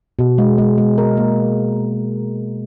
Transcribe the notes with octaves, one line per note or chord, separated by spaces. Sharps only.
B2
G#3
G#3
G#3
A#4
A#3